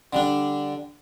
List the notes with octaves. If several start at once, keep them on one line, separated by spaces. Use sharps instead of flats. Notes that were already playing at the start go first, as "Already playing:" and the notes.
D3 G3 D4